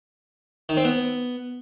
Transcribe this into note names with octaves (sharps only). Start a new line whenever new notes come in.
D#3
C4
B3